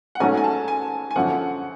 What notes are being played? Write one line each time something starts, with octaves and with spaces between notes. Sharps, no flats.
F#5
G#2 F#3 A3 C#4 G#5
G#5
A5
G#5
G#5
F#2 D3 F3 F#5